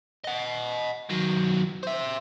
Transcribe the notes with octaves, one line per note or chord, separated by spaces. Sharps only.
D#5 F#5
D#3 F#3
C5 E5